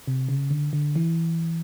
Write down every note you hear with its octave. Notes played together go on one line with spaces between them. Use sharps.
C3
C#3
D3
D3
E3